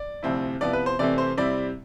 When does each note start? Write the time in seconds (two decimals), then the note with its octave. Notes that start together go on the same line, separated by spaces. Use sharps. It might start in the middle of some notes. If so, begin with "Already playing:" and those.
Already playing: D5
0.23 D2 C3 F3 C4 E4
0.61 C3 F3 B3 E4 D5
0.73 B4
0.86 C5
0.99 C3 E3 A3 C4 D5
1.18 C5
1.37 C3 G3 C4 E4 D5